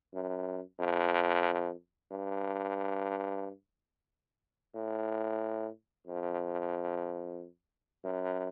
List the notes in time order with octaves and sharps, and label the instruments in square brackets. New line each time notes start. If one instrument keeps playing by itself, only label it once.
[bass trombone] F#2
F2
G2
A2
F2
F#2